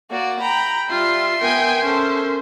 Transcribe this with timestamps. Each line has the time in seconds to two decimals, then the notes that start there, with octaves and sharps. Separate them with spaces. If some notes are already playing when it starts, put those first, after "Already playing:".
0.11 A#3 F#4 D5
0.40 G5 A#5 B5
0.90 G3 F4 E5 G5 C6
1.41 B3 A#4 G5 G#5
1.85 C#4 A4 C5